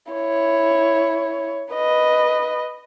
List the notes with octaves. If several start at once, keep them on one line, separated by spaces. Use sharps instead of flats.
E4 C#5
B4 D#5